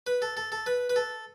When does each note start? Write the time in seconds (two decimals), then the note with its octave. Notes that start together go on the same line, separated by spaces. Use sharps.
0.07 B4
0.22 A4
0.37 A4
0.52 A4
0.66 B4
0.90 B4
0.96 A4